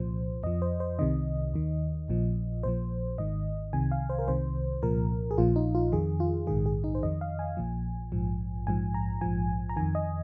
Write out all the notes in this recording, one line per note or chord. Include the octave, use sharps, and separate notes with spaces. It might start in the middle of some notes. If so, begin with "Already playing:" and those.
Already playing: C2 A#2 F3 C5
F2 F3 D#5
C5
C5
C2 C3 D#3 D#5
D#2 D#3
A#1 A#2 F3
A#1 A#2 F3 C5
G#1 G#2 D#3 D#5
C2 C3 D#3 G#5
F5
C5
A#4
C2 C3 D#3 C5
C2 A#2 F3 A#4
G#4
A#1 A#2 F3 F4
D#4
F4
F2 D#3 G#4
F4
A#1 G#2 D#3 G#4
G#4
D#4
C5
F2 D#3 D#5
F5
G#5
A#1 A#2 F3
A#1 G#2 F3
A#1 G#2 F3 G#5
A#5
A#1 G#2 F3 G#5
A#5
F2 D#3 G#5
D#5